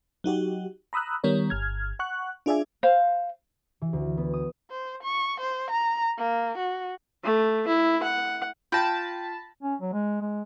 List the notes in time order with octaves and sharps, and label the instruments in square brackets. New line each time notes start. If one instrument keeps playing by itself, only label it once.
[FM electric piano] F#3 D#4 F#4 G4
A#5 B5 D#6 E6 F#6
D#3 G3 B3 A#4 C#5
G1 F6 G#6
F#5 C#6 F#6
D4 F4 G#4 D5 E5 G#5
[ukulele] C5 F5
[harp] E3
D2
B3
D#6
[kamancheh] C5
C#6
C5
A#5
A#3
F#4
[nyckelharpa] A3
E4
F#5
[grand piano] F4 A#6 [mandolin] G5 [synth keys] A5 B5
[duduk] C#4
F#3
G#3
G#3